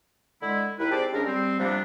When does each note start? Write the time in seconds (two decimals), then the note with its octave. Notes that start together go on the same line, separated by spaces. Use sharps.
0.42 D3 G#3 E4
0.79 D#2 E4 B4
0.91 C4 G4 G#4 C5 D5 A5
1.13 C#3 G#3 C#4 D4 A#4
1.25 G3 C4
1.59 C3 F3 G3 A#3 B3 D4